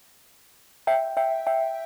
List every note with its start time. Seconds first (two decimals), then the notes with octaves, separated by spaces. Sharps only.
0.87 E5 G5
1.17 E5 G5
1.47 E5 G5